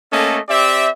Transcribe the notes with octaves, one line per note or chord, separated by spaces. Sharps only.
A3 A#3 C#4 A4 D#5
C4 G4 D5 E5